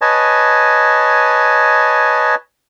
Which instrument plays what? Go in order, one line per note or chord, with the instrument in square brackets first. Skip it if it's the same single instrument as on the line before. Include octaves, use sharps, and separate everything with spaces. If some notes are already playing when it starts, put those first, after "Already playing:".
[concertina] B4 C#5 D#5 G#5 A5